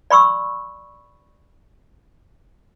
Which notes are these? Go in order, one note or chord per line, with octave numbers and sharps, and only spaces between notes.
D5 B5 C#6 E6